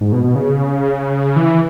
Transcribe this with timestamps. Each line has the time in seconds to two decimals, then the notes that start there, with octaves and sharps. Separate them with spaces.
0.01 G#2
0.13 B2
0.24 B2
0.35 C#3
1.36 E3